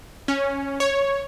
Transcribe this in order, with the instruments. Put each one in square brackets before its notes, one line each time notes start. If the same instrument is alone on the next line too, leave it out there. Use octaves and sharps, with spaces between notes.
[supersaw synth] C#4
C#5